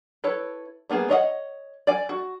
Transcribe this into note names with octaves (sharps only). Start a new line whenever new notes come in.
E4 A4 B4 C#5
G3 A#3 B3 G#4
C#5 D#5 E5 F#5
D5 G#5
F#4